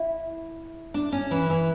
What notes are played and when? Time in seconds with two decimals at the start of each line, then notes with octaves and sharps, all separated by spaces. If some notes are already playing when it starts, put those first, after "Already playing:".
Already playing: E4
0.94 D4
1.12 C#4
1.31 E3
1.50 E3